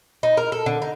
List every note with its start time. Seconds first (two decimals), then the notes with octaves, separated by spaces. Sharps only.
0.23 D#4
0.37 A#4
0.52 A4
0.66 D3
0.82 D#4